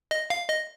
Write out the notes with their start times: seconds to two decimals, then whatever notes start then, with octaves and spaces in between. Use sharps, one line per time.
0.11 D#5
0.30 F5
0.49 D#5